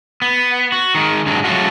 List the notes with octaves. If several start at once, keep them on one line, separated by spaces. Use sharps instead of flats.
B3
F#4
D#3 G#3
G2 D3 F#3 G#3
F#3 G#3 A3 C#4 F4 F#4